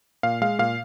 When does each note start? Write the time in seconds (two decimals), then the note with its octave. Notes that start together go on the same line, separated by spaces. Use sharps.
0.23 A#2 F5
0.42 G#3 F5
0.59 A#2 F5